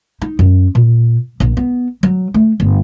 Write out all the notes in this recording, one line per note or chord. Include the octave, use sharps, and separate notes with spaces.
D#4
F#2
A#2
A#1
B3
F#3
A3
G1